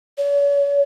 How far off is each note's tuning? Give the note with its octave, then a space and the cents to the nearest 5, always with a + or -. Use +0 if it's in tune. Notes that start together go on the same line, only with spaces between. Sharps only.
C#5 +40